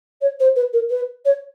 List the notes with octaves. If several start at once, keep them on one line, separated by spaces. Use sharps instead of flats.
C#5
C5
B4
A#4
B4
C#5